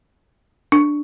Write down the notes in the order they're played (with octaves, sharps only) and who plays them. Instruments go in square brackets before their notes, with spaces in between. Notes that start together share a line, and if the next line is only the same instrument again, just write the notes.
[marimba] D4